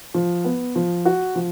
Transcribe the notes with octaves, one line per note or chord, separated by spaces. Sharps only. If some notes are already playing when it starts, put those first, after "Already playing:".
F3
B3
F3
F#4
F3